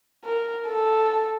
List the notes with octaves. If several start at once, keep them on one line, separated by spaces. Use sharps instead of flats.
A#4
A4